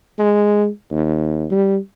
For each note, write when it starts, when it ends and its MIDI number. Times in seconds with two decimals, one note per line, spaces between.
0.19 0.68 56
0.91 1.46 39
1.51 1.78 55